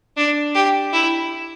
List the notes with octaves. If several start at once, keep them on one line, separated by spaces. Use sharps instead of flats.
D4
G4
E4